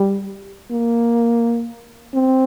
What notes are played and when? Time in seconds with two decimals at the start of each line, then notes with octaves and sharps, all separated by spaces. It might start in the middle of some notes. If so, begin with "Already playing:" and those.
Already playing: G3
0.71 A#3
2.14 C4